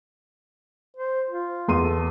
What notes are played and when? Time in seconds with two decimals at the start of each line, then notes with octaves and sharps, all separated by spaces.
0.97 C5
1.30 F4
1.68 E2 C6 D#7
1.82 A4